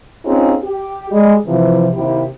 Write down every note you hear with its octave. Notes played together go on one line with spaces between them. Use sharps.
C4 C#4 D#4 F4 G4 G#4
G4
G3 G#3
C3 E3 F3
D#2 C3 E4 G4